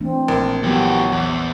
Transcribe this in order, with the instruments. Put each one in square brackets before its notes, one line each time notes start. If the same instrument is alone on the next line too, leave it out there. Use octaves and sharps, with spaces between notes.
[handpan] E3 A3 D4 [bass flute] C4
[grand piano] A#1 [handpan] A#4
[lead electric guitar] E3 G4 [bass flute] F#3 [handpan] B3
[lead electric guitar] E2